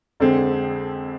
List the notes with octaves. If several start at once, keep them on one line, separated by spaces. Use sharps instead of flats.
F2 D3 G#3 C4